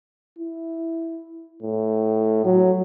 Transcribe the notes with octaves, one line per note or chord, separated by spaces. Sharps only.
E4
A2
F#3